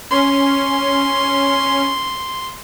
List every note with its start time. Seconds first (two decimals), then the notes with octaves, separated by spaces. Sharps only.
0.11 C#4 C6